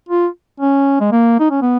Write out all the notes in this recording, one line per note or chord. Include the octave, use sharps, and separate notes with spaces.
F4
C#4
G#3
A#3
D#4
C#4
B3